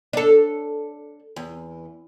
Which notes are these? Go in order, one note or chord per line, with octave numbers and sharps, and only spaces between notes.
D4 A4
E2